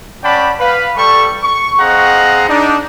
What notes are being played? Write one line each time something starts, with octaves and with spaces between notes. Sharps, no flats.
C#4 D5 F#5 G5 A5 B5
B4 F5 B5
G3 A4 C#6
C#6
C4 G#4 D#5 F5 F#5 A#5
D4 D#4